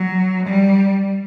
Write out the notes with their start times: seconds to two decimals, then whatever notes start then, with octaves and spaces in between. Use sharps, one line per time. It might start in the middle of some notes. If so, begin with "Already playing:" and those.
Already playing: F#3
0.46 G3